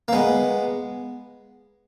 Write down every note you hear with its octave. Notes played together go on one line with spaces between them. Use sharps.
A#3
G#3 B3